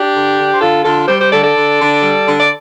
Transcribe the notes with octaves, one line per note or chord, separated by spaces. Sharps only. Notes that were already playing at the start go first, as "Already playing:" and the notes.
Already playing: D4 G4
D3
D3
C5
D3 F4 A4
D3 F4 A4
G3 G4 C5
G4 C5
D3 A4 D5
A4 D5
D3
D3
G3
D3
D5